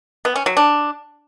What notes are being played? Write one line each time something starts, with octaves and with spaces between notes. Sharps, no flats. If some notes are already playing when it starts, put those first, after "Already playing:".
B3
C#4
F#3
D4